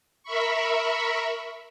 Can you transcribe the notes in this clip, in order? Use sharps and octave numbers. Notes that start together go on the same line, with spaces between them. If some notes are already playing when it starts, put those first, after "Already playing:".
A#4 E5 B5 C#6